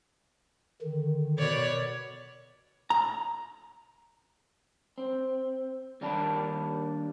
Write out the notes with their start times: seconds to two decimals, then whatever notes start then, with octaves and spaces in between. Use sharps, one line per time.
0.82 D3 D#3
1.39 B2 C#5 D5
2.90 A#5
4.98 C4
6.01 D#2 G3 A#3 D4 A5 B5